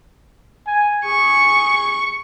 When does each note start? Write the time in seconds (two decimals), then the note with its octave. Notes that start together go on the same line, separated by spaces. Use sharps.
0.67 G#5
1.05 G#4 C#6